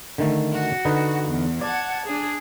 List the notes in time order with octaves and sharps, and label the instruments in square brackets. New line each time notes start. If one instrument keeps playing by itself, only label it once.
[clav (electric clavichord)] D3 D#3 A3
[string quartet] F#4
[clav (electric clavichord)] D3 D#4 B4
[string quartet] E2
[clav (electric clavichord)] D5 [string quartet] F#5 A5 G#6
[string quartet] D4 G#4